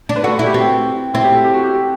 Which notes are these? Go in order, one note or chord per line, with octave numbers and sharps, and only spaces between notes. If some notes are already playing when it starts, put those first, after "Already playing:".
D4
B4
F#4 A4
B4
E4 A4
G4
C4 F#4
C4 E4
G4
A4
G4
F#4
G4
A4